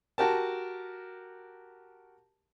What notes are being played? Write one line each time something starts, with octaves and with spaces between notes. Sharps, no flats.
F#4 G4 A#4 A5